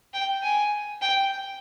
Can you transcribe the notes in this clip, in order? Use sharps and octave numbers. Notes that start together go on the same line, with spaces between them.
G5
G#5
G5